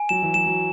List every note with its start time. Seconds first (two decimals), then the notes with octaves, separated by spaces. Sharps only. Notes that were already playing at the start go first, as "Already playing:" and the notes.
Already playing: G#5
0.09 F#3 E7
0.23 E3
0.34 F#3 E7
0.46 F#3